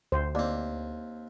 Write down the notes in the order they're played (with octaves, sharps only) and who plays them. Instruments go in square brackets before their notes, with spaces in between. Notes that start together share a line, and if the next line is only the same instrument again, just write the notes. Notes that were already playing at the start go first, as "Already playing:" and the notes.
[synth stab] D2 [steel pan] C5
[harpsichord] D#2 C4 [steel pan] D5